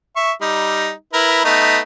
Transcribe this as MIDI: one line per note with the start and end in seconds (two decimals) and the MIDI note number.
0.16 0.32 76
0.16 0.32 85
0.41 0.91 55
0.41 0.91 63
1.13 1.42 64
1.13 1.42 70
1.13 1.42 71
1.44 1.79 57
1.44 1.79 59
1.44 1.79 63